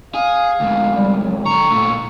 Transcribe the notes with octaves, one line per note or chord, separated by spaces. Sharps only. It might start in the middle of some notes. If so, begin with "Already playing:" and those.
G#4 F5
D2 G#2
G3
F#3
D3 A#5 C#6
A#2 A3